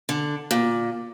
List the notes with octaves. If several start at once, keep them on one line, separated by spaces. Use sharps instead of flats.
D3
A#2